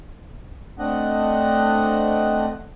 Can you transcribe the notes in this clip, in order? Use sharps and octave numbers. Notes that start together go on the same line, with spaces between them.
A3 C4 D4 D#5 F#5